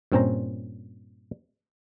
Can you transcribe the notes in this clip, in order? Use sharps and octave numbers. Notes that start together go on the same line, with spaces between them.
G2 A#2 C4 C#4 C5 A#5